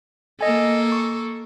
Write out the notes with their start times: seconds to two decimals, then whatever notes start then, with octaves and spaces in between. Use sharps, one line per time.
0.41 A#3 A4 D#5 G#5
0.92 C#6